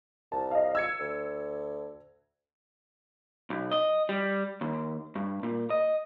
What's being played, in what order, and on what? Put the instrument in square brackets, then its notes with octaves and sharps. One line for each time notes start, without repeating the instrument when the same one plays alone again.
[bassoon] C2 [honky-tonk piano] A5
[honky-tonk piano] D#5 F5
E6 G#6 C#7
[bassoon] D2
[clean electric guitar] B1
D#5
G3
D#2
G2
A#2
D#5